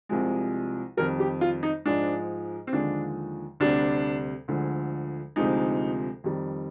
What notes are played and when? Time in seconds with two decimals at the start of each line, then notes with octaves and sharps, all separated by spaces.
0.09 C2 C3 F3 G#3
0.97 F2 D#3 G3 A#4
1.20 G4
1.41 F4
1.63 D#4
1.85 G#2 F3 G#3 D4
2.67 C4
2.73 D#2 D3 F3 G#3 D4
3.60 D2 C3 G3 D4
4.48 D2 D3 F3 G#3
5.36 D2 C3 F3 G#3 D#4
6.24 F2 D#3 G3